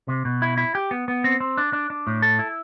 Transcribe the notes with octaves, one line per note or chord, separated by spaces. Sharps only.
C3
B2
E4
E4
G4
B3
B3
C4
C4
D4
D4
D4
A2
A4
E4